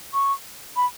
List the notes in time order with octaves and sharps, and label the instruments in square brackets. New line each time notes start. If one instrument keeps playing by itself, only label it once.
[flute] C#6
B5